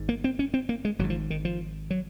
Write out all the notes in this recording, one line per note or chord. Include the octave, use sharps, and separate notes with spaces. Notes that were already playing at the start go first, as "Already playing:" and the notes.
Already playing: G#1 G#2
A#3
C4
C#4
C4
A#3
G#3
G#1 G#2 F#3
F3
D#3
F3
F#3